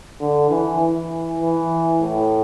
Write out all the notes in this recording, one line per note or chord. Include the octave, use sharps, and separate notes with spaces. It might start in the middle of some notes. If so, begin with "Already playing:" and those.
D3
E3
E3
E3
A2